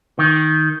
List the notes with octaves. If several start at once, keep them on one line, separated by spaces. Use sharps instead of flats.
D#3